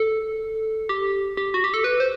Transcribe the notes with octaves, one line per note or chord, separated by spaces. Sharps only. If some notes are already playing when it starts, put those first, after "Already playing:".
Already playing: A4
G4
G4
F#4
G4
A4
B4
C5